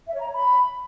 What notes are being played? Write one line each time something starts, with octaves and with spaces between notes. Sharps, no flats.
E5
C#5
A#5
C#5
B5